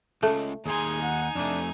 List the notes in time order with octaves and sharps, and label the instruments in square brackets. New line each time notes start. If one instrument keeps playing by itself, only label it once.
[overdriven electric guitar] C#2 C#3 [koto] A3
[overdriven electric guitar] D#2 C6 [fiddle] D#4 G#5 [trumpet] G#4
[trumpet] F#5
[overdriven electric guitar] F2 A3 [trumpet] D4